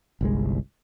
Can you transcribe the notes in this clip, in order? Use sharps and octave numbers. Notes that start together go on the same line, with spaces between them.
G1 C2 G#3